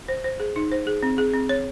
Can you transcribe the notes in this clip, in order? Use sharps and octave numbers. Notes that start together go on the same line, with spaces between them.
C5
C5
G#4
D#4
C5
G#4
C4
G#4
C4
C#5